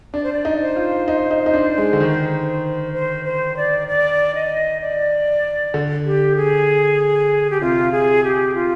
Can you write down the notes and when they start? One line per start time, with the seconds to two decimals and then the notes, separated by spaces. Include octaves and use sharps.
0.14 D4 D5
0.23 C5
0.33 D5
0.45 D#4
0.61 C5
0.76 F4
1.08 D#4
1.31 D#4
1.46 D#4
1.54 D4
1.78 G#3
1.93 D3
2.00 D#3
2.93 C5
3.25 C5
3.57 D5
3.88 D5
4.35 D#5
4.81 D5
5.74 D3
6.05 G4
6.36 G#4
7.50 G4
7.61 C3 F4
7.92 G#4
8.24 G4
8.54 F4